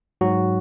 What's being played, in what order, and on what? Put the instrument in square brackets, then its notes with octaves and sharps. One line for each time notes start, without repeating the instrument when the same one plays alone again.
[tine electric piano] G#2 F#3 F#4